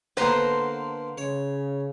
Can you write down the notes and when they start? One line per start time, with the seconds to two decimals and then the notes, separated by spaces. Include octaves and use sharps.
0.17 D3 A#3 B3 B4 C5 A#5
1.18 C#3 C#5